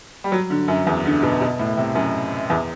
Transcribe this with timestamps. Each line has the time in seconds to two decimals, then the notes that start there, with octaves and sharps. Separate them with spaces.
0.24 G3
0.32 F#3
0.50 D3
0.68 F#2
0.87 E2
1.05 D3
1.22 B2
1.41 B2
1.59 A2
1.77 C3
1.95 F#2
2.50 E2